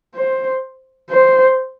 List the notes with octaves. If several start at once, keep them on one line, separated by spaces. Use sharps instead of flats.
C5
C5